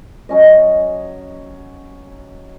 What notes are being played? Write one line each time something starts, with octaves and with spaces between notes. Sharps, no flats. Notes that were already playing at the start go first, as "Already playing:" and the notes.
F#3 C#4 D#5